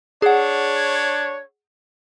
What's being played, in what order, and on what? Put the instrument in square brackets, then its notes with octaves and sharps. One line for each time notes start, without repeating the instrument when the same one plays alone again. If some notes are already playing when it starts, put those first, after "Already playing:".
[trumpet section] D4 C#5 [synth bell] G#4 F#5